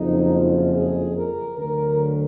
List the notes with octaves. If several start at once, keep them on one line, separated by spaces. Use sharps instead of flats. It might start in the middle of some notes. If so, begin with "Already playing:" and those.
Already playing: F#1 F2 F3 D#4
F4
G#4
A#4
D2 D3 F#3 A#4